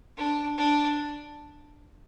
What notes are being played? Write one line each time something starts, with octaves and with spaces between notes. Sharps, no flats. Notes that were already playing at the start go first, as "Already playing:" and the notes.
D4
D4